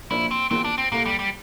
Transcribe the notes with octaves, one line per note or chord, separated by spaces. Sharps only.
A#2 F3 A#3 D4 E4
C4
E2 E3 A#3 C4 F4
D4
C4
C2 A#2 A3 A#3
G3
G3